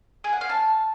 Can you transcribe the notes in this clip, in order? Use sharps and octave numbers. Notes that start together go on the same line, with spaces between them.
G#4
F#5
F5
A5